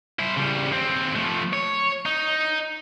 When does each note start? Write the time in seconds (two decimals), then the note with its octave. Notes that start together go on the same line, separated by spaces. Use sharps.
0.19 E4 C5
0.37 C#3 G3
0.71 D#2 C4
1.15 F3 A3
1.53 C#5
2.06 D#4